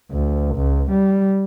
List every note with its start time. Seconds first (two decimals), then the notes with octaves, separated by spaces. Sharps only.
0.12 D2
0.56 C#2
0.91 G3